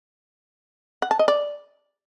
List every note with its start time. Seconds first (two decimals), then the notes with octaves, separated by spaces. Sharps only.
1.02 F#5
1.11 A5
1.19 D#5
1.28 D5